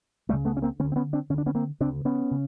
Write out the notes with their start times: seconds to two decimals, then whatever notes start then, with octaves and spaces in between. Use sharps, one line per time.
0.29 C#2 G3 A3
0.33 C#3
0.45 A3 B3
0.57 C#4
0.62 A#3 C4
0.79 D3 B3 C#4
0.84 D2
0.92 C4
0.96 B3 C#4
1.13 C4 D4
1.30 D3 C#4
1.33 D2 D4
1.46 B3 C#4
1.55 A#3 C4
1.80 C#3 C4 D4
1.84 D2
2.05 B3 C#4
2.31 C#3